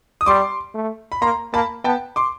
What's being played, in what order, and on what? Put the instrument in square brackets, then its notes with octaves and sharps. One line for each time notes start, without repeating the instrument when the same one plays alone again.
[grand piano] D#6
[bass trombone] G3 [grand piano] C6 D6
[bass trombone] A3
[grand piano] B5
[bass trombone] A#3 [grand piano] A#5 C6
[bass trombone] A#3 [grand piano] A5 B5
[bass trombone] B3 [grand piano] G5 A5
[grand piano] C6 D6